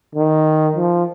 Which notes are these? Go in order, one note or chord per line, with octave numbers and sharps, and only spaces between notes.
D#3
F3